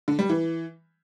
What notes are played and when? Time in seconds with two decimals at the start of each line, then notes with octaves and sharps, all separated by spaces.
0.08 D3
0.19 G3
0.30 E3